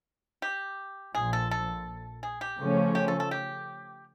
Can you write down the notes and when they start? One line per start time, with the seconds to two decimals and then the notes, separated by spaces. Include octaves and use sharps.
0.42 G4
1.15 A#1 A#2 F3 G#4
1.33 A4
1.51 A4
2.23 G#4
2.41 G4
2.59 C#3 F3 A3 C#4
2.95 G4
3.08 A4
3.20 A4
3.31 G4